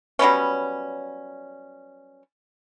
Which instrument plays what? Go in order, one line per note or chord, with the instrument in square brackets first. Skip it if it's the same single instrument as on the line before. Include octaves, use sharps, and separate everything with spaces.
[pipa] F#3 G3 B3 C#4